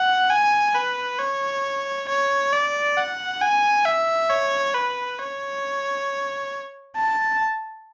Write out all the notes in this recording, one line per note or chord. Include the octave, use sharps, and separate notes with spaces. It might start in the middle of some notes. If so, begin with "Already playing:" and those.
Already playing: F#5
G#5
B4
C#5
C#5
D5
F#5
G#5
E5
C#5
B4
C#5
A5